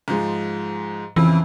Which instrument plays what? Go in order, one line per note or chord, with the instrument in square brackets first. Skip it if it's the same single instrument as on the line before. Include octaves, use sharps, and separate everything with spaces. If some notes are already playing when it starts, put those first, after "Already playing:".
[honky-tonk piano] G#2 F3 G#3
[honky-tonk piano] F2 C#3 [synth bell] E3